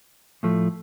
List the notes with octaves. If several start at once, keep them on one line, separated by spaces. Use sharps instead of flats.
A2 F3 A3